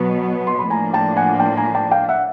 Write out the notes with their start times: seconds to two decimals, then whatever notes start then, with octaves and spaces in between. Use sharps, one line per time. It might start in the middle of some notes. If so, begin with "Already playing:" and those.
Already playing: B2 F#3 B3
0.47 C6
0.59 B5
0.70 A2 F3 A#3 D4 G#5 A#5
0.94 G5 A5
1.17 F#5 G#5
1.40 G5 A5
1.57 G#5 A#5
1.75 G5 A5
1.92 F5 G5
2.09 E5 F#5